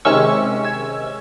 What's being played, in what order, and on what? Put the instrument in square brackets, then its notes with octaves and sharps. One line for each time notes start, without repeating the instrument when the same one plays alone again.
[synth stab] C3 D#3 G#3 C#4 C#6 E6
E6 G#6